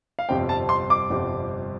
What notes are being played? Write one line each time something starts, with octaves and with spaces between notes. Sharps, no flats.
F5
G1 F2 C3 G3 C4 G5
A5
C6
D6
G1 F2 C3 G3 C4